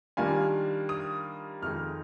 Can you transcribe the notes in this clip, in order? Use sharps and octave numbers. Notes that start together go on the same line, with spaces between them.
D#3 G3 A#3 D4 F4 G#5
D#6
F2 D#3 G#3 D#4 F6